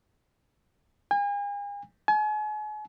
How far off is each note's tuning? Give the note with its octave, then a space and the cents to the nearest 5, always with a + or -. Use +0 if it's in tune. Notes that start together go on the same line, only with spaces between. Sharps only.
G#5 -40
G#5 +40